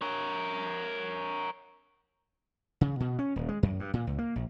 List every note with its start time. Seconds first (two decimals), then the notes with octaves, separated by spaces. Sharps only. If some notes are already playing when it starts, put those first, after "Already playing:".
0.01 A#4 C#5
2.81 C#3
3.00 B2
3.19 C#4
3.36 D#1
3.49 G#3
3.63 F#2
3.80 G2
3.94 A#2
4.07 C#2
4.18 A#3
4.36 A#1